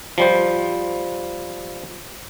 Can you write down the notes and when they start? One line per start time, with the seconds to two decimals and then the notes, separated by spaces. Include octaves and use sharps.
0.18 F3 G3 C5